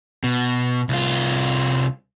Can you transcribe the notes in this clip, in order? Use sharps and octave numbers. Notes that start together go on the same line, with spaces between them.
B2
C2 F4